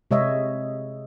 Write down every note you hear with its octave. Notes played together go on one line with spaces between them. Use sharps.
C3 G#3 C#5 D#5 E5